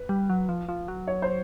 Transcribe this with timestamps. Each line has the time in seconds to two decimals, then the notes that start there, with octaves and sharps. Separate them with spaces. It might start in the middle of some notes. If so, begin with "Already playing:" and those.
Already playing: B4
0.09 G3
0.30 F#3
0.49 F3
0.69 F3
0.88 F#3
1.08 C#5
1.22 C5